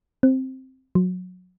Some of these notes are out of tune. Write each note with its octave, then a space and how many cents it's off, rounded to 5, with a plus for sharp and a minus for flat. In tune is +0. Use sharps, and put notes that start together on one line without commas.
C4 +0
F#3 -25